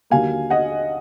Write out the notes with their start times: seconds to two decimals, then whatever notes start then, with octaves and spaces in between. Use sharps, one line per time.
0.10 D#2 D3 F#3 A#3 F5 G#5
0.50 D#5 F#5